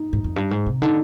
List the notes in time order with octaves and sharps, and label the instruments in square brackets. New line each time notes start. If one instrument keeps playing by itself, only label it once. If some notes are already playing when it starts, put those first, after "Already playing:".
Already playing: [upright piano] D#4
[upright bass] G#2
F2
G2
G#2
C3
[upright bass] D3 [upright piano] D#4